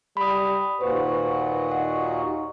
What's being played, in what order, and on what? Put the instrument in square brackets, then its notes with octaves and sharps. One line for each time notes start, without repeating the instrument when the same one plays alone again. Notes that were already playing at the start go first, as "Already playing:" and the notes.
[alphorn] G3 [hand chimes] B5 D#6
[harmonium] D#2 A#2 F#4 [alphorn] B4 [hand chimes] C5
[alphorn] D#4 [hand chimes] F#5